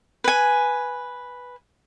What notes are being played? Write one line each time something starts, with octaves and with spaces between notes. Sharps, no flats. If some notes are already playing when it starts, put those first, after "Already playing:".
B4 G#5